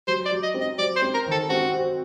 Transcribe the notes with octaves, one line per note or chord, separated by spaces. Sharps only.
F#3 C5
D5
F#3
D#5
C4
D#5
F#3 D5
C5
C4
A#4
D#3 A4
C4 F#4
F#4